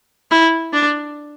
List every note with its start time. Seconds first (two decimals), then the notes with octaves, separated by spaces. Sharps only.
0.31 E4
0.73 D4